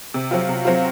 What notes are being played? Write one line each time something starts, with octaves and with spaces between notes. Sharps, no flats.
C3
F#3 C4 F4
C3
F#3 C4 F4